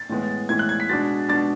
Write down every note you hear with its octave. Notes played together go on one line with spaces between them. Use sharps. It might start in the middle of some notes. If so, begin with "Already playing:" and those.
Already playing: A6
A2 E3 G#3 B3
A2 E3 G#3 B3 G#6
F#6
G#6
B6
B2 G#3 D4 A6
B2 G#3 D4 A6